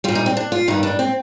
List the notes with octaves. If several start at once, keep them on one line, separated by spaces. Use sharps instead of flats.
A#2 G3 F4
D#4
C4
D4
F4
G2 D#3 G3 D#4
D4
C4